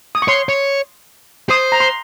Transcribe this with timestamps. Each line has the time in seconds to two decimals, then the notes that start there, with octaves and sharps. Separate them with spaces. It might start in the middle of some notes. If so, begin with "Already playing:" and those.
0.15 D#6
0.22 C#6
0.28 C#5 C6
0.49 C#5
1.50 C5 D#6
1.72 A#5
1.80 C6